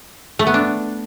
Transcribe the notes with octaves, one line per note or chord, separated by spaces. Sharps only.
A3
B3
D4